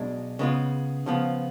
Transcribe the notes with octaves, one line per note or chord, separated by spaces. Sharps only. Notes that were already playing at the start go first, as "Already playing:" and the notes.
Already playing: B1 B2 G#3 D4
C#3 G#3 B3 F4
C#3 F3 B3 F4